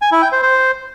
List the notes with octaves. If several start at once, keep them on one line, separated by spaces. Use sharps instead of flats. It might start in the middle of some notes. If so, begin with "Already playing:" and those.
G#5
E4
G5
C5
C5